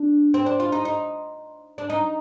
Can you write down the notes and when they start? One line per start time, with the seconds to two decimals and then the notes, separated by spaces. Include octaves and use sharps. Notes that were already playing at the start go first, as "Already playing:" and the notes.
Already playing: D4
0.34 C4
0.46 D4
0.60 F4
0.72 D#4
0.85 D#4
1.78 D4
1.90 D#4